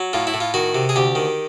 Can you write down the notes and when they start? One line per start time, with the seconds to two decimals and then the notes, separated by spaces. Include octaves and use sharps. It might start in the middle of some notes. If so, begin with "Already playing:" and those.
Already playing: F#3
0.13 A2 F4
0.27 E4
0.34 A2
0.41 F4
0.54 D#3 F#4
0.75 C3
0.89 G#4
0.96 D2 G4
1.15 D#3